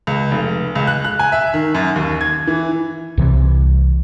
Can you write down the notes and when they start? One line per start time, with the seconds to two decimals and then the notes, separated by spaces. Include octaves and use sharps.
0.07 C#2
0.31 F1
0.75 C#2
0.87 F#6
1.04 F#6
1.19 G#5
1.32 E5
1.54 D#3
1.75 F#2
1.96 D#2
2.21 G#6
2.47 E3
3.17 C2 C3 E3